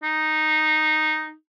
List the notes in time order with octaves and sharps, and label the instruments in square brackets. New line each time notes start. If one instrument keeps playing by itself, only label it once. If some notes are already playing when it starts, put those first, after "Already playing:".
[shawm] D#4